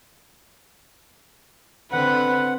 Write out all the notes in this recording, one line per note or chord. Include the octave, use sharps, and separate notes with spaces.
D3 C4 B4 F#5